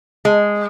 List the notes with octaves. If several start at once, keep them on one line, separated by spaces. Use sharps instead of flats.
G#3